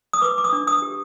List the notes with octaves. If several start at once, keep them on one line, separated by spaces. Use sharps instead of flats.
D#6
B4 D6
D6
D#6
D4
D#6
G4